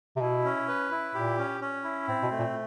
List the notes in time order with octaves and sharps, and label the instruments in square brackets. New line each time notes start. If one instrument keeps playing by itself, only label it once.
[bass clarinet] C3
[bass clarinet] B2 [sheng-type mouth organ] E4
[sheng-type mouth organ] C#4
B4
E4
[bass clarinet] A#2 [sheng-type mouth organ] G4
[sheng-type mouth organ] C#4
C#4
E4
[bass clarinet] A2 [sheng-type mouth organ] C4
[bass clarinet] B2
[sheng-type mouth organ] A3
[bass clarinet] A#2